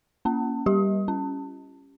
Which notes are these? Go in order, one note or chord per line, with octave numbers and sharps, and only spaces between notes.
A#3 C#4
G3 G4
C#4